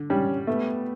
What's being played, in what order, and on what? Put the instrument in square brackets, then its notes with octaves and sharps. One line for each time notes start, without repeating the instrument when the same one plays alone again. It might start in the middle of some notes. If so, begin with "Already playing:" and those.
Already playing: [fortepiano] D3
[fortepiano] G3 [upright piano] C#4
[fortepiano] A3 [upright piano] B3